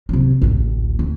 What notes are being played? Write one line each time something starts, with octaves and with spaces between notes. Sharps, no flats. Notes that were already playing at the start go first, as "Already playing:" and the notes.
C3 F#3
A1 D2
D2